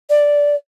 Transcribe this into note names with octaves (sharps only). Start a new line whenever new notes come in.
D5